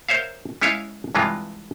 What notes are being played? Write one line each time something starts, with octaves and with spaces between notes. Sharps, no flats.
A#4 C5 C#5 E5 F5
G#3 C#4 E4 C#5 D#5 F5
G2 C3 E3 G#3 F4